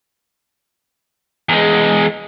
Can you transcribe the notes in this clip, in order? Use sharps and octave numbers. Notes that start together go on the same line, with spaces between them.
E2 G#3